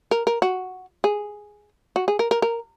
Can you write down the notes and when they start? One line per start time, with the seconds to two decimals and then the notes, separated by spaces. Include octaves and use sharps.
0.11 A#4
0.27 A#4
0.42 F#4
1.04 G#4
1.96 F#4
2.08 G#4
2.19 A#4
2.31 A#4
2.42 A#4